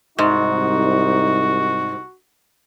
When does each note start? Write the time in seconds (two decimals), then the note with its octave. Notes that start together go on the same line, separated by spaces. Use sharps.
0.19 C2 G#2 D#4 F#4